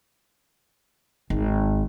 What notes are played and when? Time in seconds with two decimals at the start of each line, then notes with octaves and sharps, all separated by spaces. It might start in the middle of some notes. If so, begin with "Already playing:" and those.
1.30 G#1